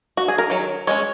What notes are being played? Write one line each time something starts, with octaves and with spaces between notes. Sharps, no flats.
F#4
G#4
A#4
D#3 F#3
G#3 C#4 C#5